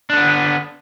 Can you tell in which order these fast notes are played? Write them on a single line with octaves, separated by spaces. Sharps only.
D4 D3 B3